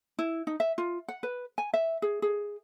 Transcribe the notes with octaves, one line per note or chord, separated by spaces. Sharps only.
E4
D#4
E5
F4
F#5
B4
G#5
E5
G#4
G#4